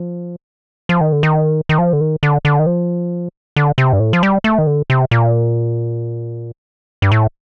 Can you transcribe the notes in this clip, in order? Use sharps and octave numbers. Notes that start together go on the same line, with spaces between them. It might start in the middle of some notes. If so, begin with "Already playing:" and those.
Already playing: F3
F3
D#3
D3
D#3
D#3
F3
D3
D#3
D3
D3
D#3
F3
D3
C3
G2
A2
F3
G3
A3
D#3
D3
C3
A#2
G2
A2